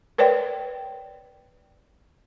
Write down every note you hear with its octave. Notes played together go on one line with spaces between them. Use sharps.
A#4 B4 C#5 D5 G5